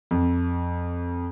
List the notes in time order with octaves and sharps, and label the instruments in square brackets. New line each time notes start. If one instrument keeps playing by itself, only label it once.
[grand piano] F2